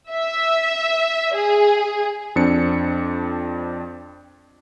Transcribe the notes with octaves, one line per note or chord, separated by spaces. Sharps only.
E5
G#4
F2 C4 D4 C#7